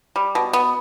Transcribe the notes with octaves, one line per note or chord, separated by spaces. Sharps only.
G3
B2
B3